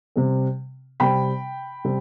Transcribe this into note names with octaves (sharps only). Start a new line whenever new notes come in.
C3 G3 C4
C3 G3 C4 G5 B5
C3 G3 C4